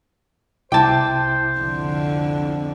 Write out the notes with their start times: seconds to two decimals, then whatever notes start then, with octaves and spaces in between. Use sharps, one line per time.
0.72 C2 E4 C5 G5 A5 D6
1.59 F2 D3